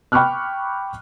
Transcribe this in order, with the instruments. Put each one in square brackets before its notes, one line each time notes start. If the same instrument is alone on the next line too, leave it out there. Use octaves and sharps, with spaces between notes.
[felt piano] G5 B5 C#6 D6 F6 F#6